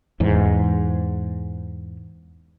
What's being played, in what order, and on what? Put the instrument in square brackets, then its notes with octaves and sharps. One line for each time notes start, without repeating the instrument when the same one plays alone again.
[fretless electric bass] E2 G#2